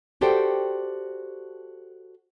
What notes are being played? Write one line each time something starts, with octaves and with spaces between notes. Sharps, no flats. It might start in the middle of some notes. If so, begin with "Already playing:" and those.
F#4 G4 A4 C5 D5 G5